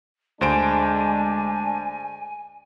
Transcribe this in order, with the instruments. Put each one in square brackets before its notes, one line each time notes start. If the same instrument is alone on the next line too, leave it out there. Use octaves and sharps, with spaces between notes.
[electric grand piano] D2 C5 D7 [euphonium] G#3 [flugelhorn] D4 [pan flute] G#5